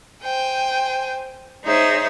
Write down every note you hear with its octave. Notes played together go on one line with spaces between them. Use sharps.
C5 G5 G#5
D#4 G#4 C5 C#5 E5